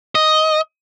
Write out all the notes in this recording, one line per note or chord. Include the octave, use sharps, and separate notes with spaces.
D#5